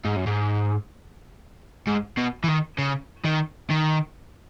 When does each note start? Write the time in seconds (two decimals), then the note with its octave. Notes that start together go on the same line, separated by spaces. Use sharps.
0.05 G#2
0.16 F#2
0.26 G#2
1.87 G#2
2.18 B2
2.44 E3
2.48 D#3
2.78 C#3
3.24 D#3
3.70 D#3